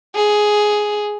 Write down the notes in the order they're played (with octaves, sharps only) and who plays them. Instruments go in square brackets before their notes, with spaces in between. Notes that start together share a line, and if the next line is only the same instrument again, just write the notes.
[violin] G#4